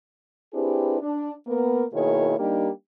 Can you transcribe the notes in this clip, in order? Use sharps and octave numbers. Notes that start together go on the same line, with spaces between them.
C4 D4 E4 G4 G#4 B4
D4
A#3 B3 A#4
B2 D#3 A#3 E4 G#4 C#5
G3 A#3 D4 D#4 G4